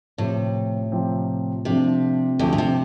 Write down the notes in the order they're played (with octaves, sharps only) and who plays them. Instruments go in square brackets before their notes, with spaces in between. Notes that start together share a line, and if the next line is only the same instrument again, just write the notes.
[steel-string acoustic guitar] A2 [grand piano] C3 F3 C4 G4
[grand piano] C3 F3 C4 G4
[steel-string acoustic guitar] C3 [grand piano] F3 A3 D4 G4
[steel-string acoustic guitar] D2 D3 [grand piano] F3 A3 D4 G4
[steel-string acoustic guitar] A2
C3